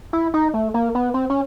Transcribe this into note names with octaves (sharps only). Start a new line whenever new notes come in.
E4
D#4
A3
A#3
B3
C4
C#4